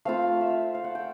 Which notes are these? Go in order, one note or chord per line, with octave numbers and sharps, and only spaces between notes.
A3 C4 F4 F5
E5
F5
F5
F#5
G5